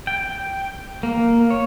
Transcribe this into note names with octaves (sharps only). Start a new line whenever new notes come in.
G5
A#3
C#5